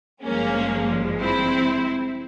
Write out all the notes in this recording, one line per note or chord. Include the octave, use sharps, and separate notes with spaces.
G#1 G2 F3 G#3 A#3 C#4
C4 E4